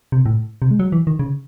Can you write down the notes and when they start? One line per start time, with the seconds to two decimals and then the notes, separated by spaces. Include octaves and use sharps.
0.12 C3
0.26 A2
0.62 C3
0.71 G#3
0.79 F#3
0.92 E3
1.07 D#3
1.19 C#3